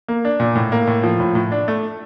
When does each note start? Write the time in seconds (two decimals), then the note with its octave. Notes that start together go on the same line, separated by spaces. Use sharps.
0.08 A#3
0.25 D4
0.40 A#2
0.55 A2
0.72 A#3
0.87 A2
1.04 F3
1.20 A2
1.35 A2
1.52 D4
1.68 A3